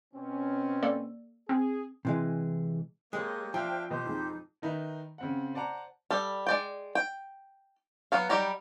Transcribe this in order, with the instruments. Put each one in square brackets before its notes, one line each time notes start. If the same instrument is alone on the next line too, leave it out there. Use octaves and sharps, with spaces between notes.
[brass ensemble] B2 C4 C#4
[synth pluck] A#3 A4 D5
[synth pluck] C4 [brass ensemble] G#4
[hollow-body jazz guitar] C3 E3 G#3
[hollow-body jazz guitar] G#3 [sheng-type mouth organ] A#3 D#5 [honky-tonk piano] G4 A4 C#5 [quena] C5
[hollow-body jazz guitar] F3 [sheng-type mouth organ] D4 E5 F5 [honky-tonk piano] G5 A5
[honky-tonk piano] B2 D#5 [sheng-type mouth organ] G4 C5
[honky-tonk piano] F2 G#3 [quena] D#4
[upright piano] D#3 D#4 B4 E5
C#3 C4 F#5
C5 D5 F#5 A5 A#5
[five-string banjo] G3 A4
G#3 D5 G5
G5
F#3 B3 F5
F#3 G3 D#4 G4 A#5